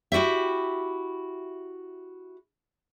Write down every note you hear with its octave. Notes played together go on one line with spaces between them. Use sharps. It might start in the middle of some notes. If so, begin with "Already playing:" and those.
E4 F#4 G4 E5